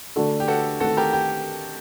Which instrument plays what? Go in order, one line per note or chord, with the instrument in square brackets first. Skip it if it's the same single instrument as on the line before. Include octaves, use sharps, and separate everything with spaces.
[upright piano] D3 A3 D4 F#4 A4
[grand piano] G4
F#4 A4
[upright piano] D#3 A3 C4 [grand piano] F#4 A4
[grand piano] G4 A#4
G4